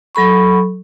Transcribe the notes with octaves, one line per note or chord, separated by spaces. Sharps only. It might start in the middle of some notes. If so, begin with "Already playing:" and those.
F#3 A4 B5 C#6